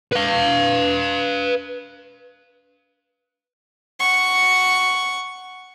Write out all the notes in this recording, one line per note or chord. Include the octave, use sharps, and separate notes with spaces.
B4 F5
F#5 C#6